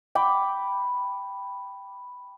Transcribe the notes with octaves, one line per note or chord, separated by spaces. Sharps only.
G5 B5 D6